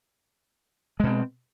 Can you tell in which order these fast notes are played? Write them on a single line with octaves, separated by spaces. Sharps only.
G#3 B2 C4